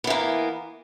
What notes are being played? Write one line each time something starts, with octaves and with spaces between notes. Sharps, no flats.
E3 A#3 B3